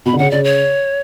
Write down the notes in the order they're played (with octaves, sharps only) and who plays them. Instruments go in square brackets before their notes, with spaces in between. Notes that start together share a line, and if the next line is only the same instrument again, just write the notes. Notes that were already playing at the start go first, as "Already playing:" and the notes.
[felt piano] B2 [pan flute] B5
[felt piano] D3
[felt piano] C#3 [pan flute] F#5
[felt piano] C#3 [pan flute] D5
[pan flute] C#5